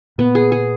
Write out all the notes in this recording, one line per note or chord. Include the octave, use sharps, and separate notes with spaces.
A#2 B3
G#4
G#4